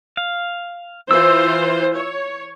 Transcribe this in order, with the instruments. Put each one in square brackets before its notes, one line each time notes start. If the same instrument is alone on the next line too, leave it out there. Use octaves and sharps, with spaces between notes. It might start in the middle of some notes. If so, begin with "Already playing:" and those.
[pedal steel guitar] F5
[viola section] E3 F4 C5 [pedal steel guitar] E6
[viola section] C#5